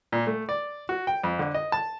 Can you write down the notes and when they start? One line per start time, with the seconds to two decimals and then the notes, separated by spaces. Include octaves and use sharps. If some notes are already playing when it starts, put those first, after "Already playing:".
0.12 A#2
0.27 A3
0.49 D5
0.89 F#4
1.07 G5
1.23 F2
1.39 D3
1.54 D#5
1.72 A5